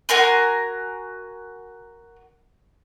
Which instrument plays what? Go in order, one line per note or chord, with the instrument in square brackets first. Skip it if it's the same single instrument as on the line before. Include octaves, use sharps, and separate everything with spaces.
[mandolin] F#4 A#4 G#5 C6